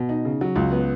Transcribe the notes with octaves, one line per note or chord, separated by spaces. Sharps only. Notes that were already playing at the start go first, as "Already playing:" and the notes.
Already playing: B2
D#4
C#3
F#3
C#2
B3